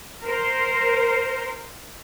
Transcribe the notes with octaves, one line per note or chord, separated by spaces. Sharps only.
A#4 C5